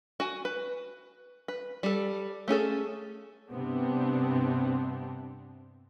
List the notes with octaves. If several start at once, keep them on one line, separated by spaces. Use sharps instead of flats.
F#4 G#5
B4
B4
G3 A4
A3 C#4 G#4 A4
G2 C3 B3 C4 D4